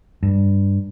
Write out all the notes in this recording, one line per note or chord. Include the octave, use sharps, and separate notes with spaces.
G2